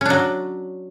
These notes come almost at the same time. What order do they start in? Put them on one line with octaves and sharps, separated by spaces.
C#4 D4 F#3